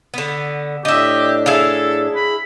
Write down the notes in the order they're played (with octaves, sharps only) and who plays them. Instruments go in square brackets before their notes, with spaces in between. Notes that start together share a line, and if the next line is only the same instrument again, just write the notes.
[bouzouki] D3 B3
[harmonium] A2 D4 [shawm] G4 [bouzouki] D#5 E5
[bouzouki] E4 G#4 F5 [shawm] A4
[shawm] B5